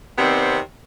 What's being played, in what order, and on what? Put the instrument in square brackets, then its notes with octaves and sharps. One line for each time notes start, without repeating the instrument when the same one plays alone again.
[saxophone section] C3 D#3 B3 C4 D5